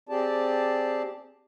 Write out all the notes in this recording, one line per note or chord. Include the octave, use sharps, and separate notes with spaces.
C4 G4 G#4 D5 A5